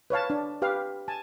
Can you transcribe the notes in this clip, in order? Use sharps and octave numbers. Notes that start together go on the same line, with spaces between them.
B4 C#5 F5 A5
D4
G4 B4 F5
G#5 A5